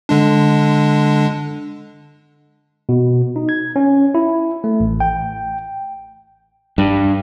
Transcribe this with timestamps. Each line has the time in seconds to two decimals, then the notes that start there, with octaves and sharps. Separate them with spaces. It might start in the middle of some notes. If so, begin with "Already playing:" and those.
0.09 D3 G#3 D4
2.89 B2
3.36 D#4
3.49 G#6
3.76 C#4
4.15 E4
4.64 A3
4.80 A1
5.00 G5
6.78 G2